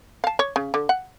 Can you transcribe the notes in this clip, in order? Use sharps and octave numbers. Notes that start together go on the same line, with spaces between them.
F5 A5
C#5
C#3
D3
F#5